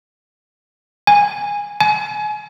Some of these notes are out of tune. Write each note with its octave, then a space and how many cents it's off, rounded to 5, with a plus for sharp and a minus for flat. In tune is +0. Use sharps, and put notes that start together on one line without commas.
G#5 -15
G#5 +30